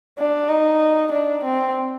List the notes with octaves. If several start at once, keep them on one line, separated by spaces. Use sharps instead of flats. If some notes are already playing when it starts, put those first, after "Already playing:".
D4
D#4
D4
C4